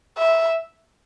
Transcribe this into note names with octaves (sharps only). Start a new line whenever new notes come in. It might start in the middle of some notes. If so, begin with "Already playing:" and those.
E5